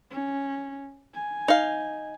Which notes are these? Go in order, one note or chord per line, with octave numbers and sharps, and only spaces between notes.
C#4
G#5
D#4 F5